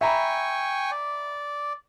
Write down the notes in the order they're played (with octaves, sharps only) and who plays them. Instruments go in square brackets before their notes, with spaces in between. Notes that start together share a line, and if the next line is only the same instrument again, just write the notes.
[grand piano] E5 A#5 B5 [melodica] G5 G#5 C#6
[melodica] D5